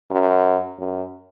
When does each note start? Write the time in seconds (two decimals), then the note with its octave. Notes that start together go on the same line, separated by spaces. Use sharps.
0.11 F#2
0.79 F#2